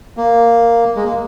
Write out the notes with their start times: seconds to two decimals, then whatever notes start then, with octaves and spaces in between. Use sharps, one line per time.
0.17 A#3
0.96 G#3
1.05 A#3